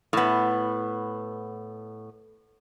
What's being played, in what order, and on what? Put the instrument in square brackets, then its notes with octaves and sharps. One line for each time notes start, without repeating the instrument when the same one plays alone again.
[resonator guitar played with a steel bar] A2 B3